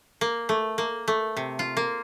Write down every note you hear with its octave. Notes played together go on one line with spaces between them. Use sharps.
A#3
A3
A#3
A3
C3
F4
A#3